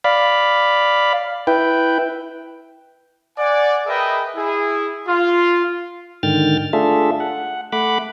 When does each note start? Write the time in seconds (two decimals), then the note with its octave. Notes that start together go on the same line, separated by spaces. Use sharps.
0.04 D5 F5 B5
1.47 E4 B4 G5
3.38 D5 F#5 G#5
3.87 G#4 A#4 B4 D#5 E5 G5
4.36 E4 G#4
5.07 F4
6.23 G#2 D3 D#3 G5 F6 A6
6.73 A3 D4 F4 G#4 A4 E5
7.20 F#5
7.72 A3 F#5 B5 D6